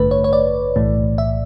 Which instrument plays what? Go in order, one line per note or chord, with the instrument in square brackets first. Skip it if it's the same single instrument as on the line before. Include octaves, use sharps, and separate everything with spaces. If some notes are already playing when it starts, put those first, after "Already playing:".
Already playing: [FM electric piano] A1 G2 D3 A3 B4
C#5
C#5
D5
B1 A2 E3 A3
E5